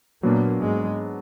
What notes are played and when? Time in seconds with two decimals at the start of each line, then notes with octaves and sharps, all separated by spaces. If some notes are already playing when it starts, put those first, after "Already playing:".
0.22 A#2 F#3 A#3 B3 D4
0.61 G#2 G#3